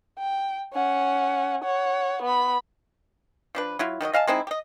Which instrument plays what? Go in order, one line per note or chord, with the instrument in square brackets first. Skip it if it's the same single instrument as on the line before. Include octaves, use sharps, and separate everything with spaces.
[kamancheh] G5
C#4 F#5
C#5 F#5
B3 B5
[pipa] F3 D4 B4
F#3 E4 F4
D#3 F#3 F4 D#5
D#5 F5 G#5 A5
G#3 C4 D#4 E4
G4 D#5